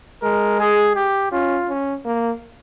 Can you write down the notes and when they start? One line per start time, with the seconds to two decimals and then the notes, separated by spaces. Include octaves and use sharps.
0.23 G#3 A#4
0.60 G#4
0.96 G4
1.32 C#4 F4
1.69 C#4
2.06 A#3